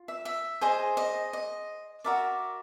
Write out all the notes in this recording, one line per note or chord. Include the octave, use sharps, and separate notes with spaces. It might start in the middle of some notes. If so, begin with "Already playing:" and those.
Already playing: F4
E5
E5
G#4 C5 D#5
D#5
D#5
F#4 A#4 D5 E5